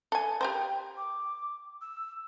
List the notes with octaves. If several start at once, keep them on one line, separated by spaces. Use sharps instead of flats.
A4 G#5
G4 A#4 C5 G5
D6
E6